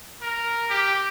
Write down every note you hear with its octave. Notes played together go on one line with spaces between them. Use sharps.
A#4
G4